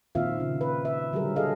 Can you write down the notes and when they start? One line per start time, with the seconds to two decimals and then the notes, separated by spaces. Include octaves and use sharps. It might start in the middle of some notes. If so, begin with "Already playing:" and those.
0.15 A#2 D#3 C4 F4 E5 F5
0.40 C#3
0.61 B4
0.85 E5
1.13 D3 F#3 G3 G#4 A#4
1.36 G#4 A4 D#5 F5